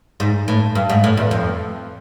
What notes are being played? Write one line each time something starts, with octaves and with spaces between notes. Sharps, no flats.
G#2
A2
G2
G#2
A2
E2
F2